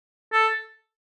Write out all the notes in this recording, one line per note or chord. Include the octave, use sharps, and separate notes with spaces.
A4